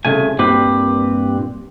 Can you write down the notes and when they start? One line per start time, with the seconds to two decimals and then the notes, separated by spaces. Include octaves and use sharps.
0.05 C2 F#2 C#3 A3 G#5
0.39 G2 A#2 C4 G4 B4